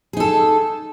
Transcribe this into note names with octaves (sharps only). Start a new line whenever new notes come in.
D#4 G#4 A4